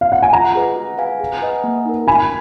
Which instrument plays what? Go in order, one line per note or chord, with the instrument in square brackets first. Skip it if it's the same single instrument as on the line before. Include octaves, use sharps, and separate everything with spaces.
[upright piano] F5
F#5
G#5
[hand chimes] F4 [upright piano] F#5 A#5
[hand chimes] G#4 B4 D#5
F#4
B4 F5 G#5
G#4
B4 D#5 G#5
A#3
D#4 A#4
[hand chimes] F#4 [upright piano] G#5 B5